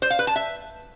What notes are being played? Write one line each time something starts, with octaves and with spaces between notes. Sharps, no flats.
C5
F5
B4
A5
E5